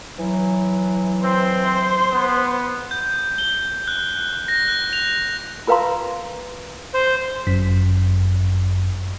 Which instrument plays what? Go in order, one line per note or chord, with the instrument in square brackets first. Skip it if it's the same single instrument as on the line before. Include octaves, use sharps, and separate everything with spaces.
[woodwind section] E3 F#3
[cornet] C4 [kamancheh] C5
[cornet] B3
[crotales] G6
G7
F#6
A#6
F#6
F7
[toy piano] F4 A#4 B4 F5 A#5 C6
[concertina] C5
[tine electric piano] G1 F#2 B6